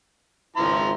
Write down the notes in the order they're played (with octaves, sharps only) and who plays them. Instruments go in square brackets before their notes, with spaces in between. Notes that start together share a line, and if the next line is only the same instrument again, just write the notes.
[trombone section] G#1 C#2 E4 [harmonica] F3 A#5 C6